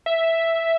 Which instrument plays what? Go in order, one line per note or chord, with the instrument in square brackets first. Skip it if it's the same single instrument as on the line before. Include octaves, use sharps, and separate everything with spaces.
[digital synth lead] E5